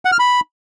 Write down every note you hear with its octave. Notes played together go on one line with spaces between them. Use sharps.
F#5
F6
B5